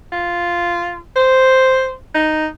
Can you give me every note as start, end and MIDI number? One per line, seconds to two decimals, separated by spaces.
0.12 0.99 65
1.16 1.93 72
2.15 2.47 63